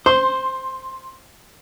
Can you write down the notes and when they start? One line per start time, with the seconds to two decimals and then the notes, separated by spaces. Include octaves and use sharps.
0.06 C5 C6